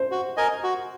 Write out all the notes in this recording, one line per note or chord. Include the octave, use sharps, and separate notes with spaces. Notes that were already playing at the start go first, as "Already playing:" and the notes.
Already playing: C5
F#4
A#4 D#5 G#5
F#4